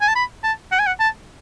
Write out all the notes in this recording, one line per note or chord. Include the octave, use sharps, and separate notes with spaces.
G#5
A5
B5
A5
F#5
G#5
F#5
A5